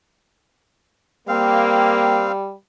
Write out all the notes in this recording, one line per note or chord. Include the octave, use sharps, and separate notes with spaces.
G3 A#3 C4 F5